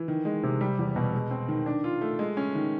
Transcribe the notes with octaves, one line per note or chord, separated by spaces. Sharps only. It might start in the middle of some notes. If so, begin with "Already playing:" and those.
Already playing: E3
D#3
G#3
C3
G3
E2
B2
G#3
C4
D#3
D4
F4
A3
G#3
C#4
D#3